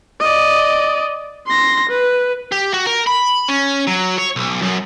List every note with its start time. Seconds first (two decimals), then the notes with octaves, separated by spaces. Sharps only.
0.20 D5 D#5
1.47 C6 A#6
1.89 B4
2.52 G4
2.73 F#4
2.86 A#4
3.06 B5
3.49 C#4
3.87 F#3
4.18 C#5
4.36 B1
4.62 F#2